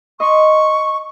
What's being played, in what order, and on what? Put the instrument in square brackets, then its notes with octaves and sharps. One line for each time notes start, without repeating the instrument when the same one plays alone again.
[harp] D#5 C6 [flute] C#6